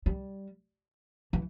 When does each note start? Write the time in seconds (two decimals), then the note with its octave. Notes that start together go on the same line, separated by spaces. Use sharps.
0.06 G3
1.33 E3